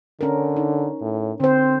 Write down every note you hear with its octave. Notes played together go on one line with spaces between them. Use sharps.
D3 C#4 A#4
D#4
A2
D3 C4 C5